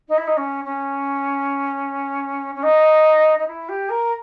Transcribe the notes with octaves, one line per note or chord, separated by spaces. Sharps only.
D#4
E4
D#4
C#4
C#4
C#4
D#4
D#4
E4
G4
A#4